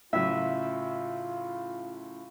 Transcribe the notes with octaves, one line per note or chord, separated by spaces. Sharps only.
A2 C#3 F#3 F4 E5